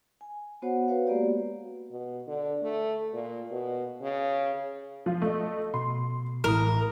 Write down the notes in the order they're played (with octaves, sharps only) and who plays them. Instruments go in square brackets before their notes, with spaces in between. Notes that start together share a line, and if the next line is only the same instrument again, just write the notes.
[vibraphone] G#5
B3 F#4 C5 C#5 F#5
F#4 B4 C#5 F5
G#3 A#3 B3 F#4 G4 D5
[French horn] B2
D3
A3
A#2
B2
C#3
[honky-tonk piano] F3 F4
A3 D#5
[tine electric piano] B2 [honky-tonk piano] C6
[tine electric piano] A1 A2 D#6 [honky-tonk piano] E3 [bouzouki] A#4